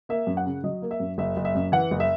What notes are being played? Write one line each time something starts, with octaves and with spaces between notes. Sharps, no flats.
A#3 E5
F#2
F#5
C#3
F#3 D#5
A#3
E5
F#2
F#1 E5
F#1
E5
F#2
E3 F#5
F#1
E5